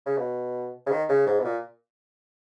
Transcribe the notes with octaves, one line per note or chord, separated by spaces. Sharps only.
C#3
B2
C#3
D#3
C#3
G#2
B2
A#2